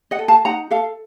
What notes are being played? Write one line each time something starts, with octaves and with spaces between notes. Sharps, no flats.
D#5 F#5
A4
F5 A5
D#4 F#5 A#5
A4 F5 A5